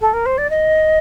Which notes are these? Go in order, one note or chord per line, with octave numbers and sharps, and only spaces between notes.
A4
A#4
C5
D5
D#5